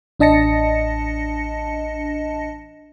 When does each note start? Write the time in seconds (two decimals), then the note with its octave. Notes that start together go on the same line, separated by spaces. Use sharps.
0.19 A1 D4 D#5 A5 A#6 C#7